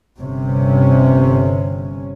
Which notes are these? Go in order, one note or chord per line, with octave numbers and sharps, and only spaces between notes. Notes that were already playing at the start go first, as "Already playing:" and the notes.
G1 G2 C3 C#4